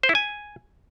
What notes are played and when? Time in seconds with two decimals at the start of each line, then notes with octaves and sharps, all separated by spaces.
0.03 C5
0.09 E4
0.15 G#5